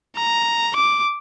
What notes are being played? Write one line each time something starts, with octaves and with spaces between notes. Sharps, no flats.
A#5
D6